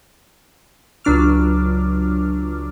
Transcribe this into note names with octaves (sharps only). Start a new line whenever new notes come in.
C#2 F#3 D4 D6 F6